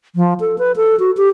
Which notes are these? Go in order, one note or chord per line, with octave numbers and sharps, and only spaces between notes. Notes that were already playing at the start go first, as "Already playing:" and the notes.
F3
A4
B4
A4
F#4
G4